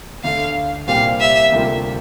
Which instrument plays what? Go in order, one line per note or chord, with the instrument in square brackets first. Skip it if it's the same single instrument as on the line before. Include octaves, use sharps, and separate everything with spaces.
[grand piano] D2 D3 A3 [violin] F5
[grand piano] C2 A#2 G3 C4 G4 [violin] F5
[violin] E5
[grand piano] D2 C3 G3 A#3 F4